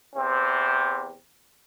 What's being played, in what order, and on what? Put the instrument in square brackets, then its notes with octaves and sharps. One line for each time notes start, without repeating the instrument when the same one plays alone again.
[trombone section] E2 C3 C4